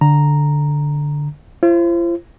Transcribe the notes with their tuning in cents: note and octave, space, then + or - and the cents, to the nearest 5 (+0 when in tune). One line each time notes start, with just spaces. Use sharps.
D3 +0 A#5 +0
F4 -45 C5 +20